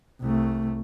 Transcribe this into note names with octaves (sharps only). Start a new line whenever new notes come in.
C2 A3